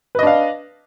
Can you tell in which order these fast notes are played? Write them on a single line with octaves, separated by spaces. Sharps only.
B4 D#5 D4 F5